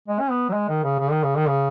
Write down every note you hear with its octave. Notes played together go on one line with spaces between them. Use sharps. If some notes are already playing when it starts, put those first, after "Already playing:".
G#3
C#4
B3
F#3
G#3
D#3
C#3
C#3
D#3
C#3
D#3
C#3